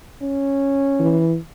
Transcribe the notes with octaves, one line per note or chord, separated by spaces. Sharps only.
C#4
E3